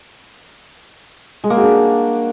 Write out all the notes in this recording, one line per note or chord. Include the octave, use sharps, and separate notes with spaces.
G#3
A#3
F#4
D4